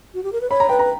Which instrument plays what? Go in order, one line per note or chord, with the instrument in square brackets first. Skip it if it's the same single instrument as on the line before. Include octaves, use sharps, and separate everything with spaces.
[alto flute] F#4
G4
A#4
B4
[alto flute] C#5 [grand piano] B5
[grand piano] A#5
[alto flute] B4 [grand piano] G5
[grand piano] A#5